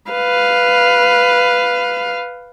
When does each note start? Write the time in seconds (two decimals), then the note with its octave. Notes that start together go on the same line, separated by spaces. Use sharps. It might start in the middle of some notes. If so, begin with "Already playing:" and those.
0.11 B4 F5